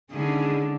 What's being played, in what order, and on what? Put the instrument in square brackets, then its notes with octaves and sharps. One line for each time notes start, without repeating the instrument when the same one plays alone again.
[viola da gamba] D3 [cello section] D#3 G#3 C#4 E4 G#4